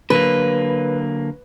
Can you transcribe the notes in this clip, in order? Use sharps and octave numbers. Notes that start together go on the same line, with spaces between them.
D3 F#3 A#3 B4